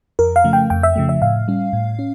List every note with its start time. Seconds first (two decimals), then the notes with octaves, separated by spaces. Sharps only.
0.19 F2 A#4
0.36 F5
0.44 C#3 F3 A3
0.53 G5
0.70 F2 G5
0.83 E5
0.96 C#3 F3 A3
1.09 E5
1.22 A2 F5
1.48 G3 C#4
1.73 A2
1.99 C#4